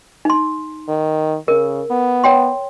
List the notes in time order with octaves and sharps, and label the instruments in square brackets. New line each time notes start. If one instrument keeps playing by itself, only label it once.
[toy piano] D#4 C6
[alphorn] D#3
[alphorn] C#3 [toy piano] A#4
[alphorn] B3
[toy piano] C#5 G5 C6